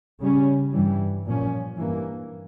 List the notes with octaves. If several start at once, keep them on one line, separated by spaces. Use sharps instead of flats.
C#3 G3 C#4
G2 E3 G3
A#2 F3 C#4
G2 E3 A#3